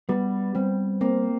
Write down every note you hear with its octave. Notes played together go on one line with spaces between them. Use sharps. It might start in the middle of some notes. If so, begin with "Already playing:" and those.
G3 B3
G3 C4
A#3 C4